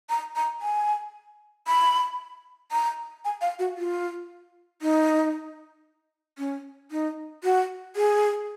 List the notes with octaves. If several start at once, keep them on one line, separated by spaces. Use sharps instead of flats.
A#5
A#5
G#5
B5
A#5
G#5
F5
F#4
F4
D#4
C#4
D#4
F#4
G#4